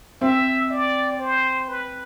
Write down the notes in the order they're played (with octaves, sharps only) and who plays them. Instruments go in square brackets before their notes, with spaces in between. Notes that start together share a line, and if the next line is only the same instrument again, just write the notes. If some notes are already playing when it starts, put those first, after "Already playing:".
[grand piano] C4 [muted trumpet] E5
[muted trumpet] D5
C5
B4